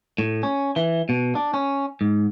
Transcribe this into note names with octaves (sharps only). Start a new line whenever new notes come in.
A2
C#4
E3
B2
D4
C#4
G#2